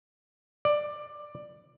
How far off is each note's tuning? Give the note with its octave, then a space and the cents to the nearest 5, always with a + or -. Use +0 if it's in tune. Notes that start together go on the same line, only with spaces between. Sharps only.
D5 +15